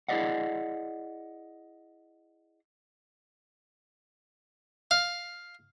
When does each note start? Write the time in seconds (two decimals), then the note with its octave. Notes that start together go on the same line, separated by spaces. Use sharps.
0.08 E4 G#4 A4 D5 D#5 F#5
4.91 F5